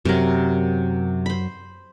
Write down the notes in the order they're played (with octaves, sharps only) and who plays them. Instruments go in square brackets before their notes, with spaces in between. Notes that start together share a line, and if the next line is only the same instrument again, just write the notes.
[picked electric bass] F#2 F#3 [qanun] C3 A#4
[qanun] C5 B5